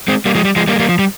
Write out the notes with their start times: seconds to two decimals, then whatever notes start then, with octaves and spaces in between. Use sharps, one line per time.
0.08 G#3 C4
0.26 G3 A#3
0.35 F3 G#3
0.45 G3
0.56 F3 G#3
0.68 G3 A#3
0.76 G#3
0.80 G3 A#3
0.89 F3
0.99 G3